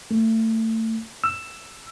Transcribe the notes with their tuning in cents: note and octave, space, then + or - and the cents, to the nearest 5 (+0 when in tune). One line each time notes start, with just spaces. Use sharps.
A3 +25
E6 +10